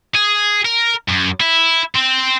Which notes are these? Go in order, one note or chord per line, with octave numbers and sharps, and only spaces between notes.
G#4
A#4
F#2
E4
C4